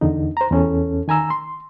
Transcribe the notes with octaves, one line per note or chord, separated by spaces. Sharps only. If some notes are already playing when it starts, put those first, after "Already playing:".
E2 D3 D#4
C5 A#5
E2 C#4 A4
D#3 G#5 A#5 E6
C6